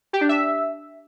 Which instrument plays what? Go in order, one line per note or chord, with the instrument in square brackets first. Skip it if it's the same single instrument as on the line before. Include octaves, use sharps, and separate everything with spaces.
[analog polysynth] G4
D4
E5